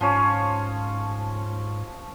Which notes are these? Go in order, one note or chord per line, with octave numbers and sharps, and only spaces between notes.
G#2 F3 C#4 C#5